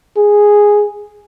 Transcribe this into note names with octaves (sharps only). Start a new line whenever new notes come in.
G#4